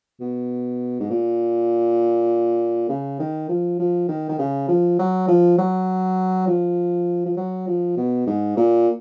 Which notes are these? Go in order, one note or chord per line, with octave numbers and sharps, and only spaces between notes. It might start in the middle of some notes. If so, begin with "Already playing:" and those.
B2
G#2
A#2
C#3
D#3
F3
F3
D#3
D#3
C#3
F3
F#3
F3
F#3
F3
F3
F#3
F3
B2
G#2
A#2